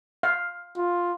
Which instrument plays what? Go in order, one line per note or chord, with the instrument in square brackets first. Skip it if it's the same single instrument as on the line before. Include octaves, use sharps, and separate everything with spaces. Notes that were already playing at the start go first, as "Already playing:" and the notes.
[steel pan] F5
[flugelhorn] F4